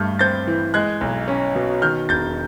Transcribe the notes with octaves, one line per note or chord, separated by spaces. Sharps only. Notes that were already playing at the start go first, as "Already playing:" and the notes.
Already playing: G2 A3 F6 G6
C4 G6 A6
E3
G#3 F#6 G#6
B1
C#4
B2
D#3 F6 G6
E1 G6 A6